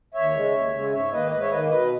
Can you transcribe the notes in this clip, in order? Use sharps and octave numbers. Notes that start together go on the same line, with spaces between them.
D#2 C#5 E5
C#3 G#3
D#2
C#3 G#3
G#2 C#5 E5
D#3 A#3 B4 D#5
G#2 B4 D#5
C#5 E5
D#3 A#3 B4 D#5
B2 B4 D#5